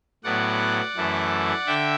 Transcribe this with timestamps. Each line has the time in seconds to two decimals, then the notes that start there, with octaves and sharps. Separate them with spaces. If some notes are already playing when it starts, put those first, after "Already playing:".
0.24 A2 F#3 B3 D5 F#5
0.95 F#2 E3 A3
1.67 D3 E5 G5